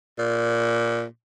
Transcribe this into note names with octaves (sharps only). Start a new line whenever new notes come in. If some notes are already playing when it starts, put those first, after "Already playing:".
A#2